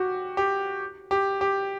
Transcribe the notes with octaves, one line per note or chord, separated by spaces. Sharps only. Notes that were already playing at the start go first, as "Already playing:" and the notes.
Already playing: F#4 G4
G4
G4
G4